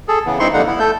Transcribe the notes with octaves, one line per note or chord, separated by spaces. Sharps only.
G#4 A4
C#3 E3 B3
G2 C4 D#4 E4 C6 C#6
F2 D3 G3 A#3 D#4 F#5
B3 E4
A3 A4 G6